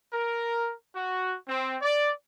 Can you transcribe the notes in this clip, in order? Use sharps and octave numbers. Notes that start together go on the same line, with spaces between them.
A#4
F#4
C4
D5